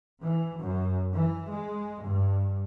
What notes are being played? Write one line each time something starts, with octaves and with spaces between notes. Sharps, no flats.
E3
F#2
E3
G#3
G2